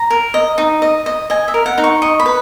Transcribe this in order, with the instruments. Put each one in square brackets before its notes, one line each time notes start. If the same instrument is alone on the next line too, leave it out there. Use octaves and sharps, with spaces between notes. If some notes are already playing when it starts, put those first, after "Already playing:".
Already playing: [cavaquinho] A#5
A#4
D#5
D#4
D#5
D#5
D#5 G#5
E5
A#4
F#5
D#4
C#6
D#5 C#6
B5
B4